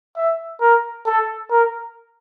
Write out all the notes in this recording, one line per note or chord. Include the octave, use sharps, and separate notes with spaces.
E5
A#4
A4
A#4